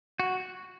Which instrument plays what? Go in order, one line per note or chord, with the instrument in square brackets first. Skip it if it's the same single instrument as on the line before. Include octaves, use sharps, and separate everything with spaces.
[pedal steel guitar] F#4